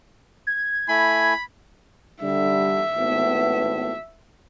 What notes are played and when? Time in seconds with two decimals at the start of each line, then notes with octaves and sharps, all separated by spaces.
0.47 G#6
0.89 A3 E4 G#5 B5
2.22 D3 G3 E5
2.96 G#1 A2 B3